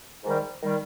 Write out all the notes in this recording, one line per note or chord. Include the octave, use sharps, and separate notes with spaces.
G#2 D#3 G3
D#3 G3